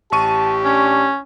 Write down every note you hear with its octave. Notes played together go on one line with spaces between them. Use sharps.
A1 G4 A5 C#6 D#7
C#4 D4